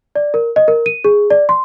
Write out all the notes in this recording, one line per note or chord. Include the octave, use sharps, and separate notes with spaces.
D5
A#4
D#5
A#4
D#7
G#4
D5
C6